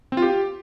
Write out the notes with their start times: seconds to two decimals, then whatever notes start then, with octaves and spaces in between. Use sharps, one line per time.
0.12 C4
0.17 F4
0.22 G4